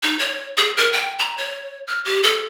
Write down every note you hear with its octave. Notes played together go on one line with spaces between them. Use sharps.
D#4
C#5
G#4
A#4
G5
A#5
C#5
F6
G4
A4